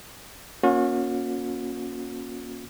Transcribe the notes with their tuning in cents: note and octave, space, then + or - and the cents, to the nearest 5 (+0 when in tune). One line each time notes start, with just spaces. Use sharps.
A#3 +25 C#4 +0 F#4 -45